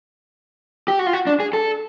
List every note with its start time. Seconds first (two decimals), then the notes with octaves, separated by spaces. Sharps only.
0.88 G4
0.99 F#4
1.07 F4
1.13 F#4
1.27 D4
1.40 G#4
1.53 A4